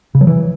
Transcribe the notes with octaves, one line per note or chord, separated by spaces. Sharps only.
C#3
F#3
E3